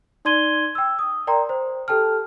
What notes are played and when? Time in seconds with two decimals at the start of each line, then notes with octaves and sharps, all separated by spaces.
0.25 D#4 D5 C6 G#6 D#7 G7
0.75 G5 E6
0.99 D#6
1.27 A#4 D5 G5 A#5 C6
1.49 C5
1.88 G4 A4 G5 A5 F6